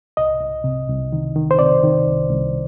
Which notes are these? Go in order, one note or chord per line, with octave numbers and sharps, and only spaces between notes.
C2 D#5
C2
C3
C2
D#3
D#3
C5
C3 D5
D#3
C2
C2